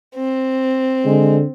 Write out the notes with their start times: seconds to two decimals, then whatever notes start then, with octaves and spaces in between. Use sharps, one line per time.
0.15 C4
1.05 D3 G#3